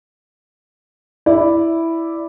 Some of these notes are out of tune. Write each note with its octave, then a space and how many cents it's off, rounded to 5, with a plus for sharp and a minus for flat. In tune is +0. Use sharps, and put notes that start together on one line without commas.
E4 +0 D5 +0